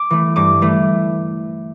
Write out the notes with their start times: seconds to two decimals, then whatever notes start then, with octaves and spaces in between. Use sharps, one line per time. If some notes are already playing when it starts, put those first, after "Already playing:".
Already playing: D6
0.10 E3 A3
0.36 G2 D6
0.62 E3 A3